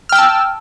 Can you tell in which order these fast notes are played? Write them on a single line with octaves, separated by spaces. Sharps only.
F6 G5 E6 A5